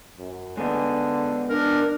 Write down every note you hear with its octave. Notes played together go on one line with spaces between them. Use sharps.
F#2
D3 G#3 B3 D#4
D4 A#4